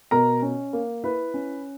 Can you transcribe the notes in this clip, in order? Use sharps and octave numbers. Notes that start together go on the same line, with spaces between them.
B2 A#4 A#5
C#4
A#3
E4 B4
C#4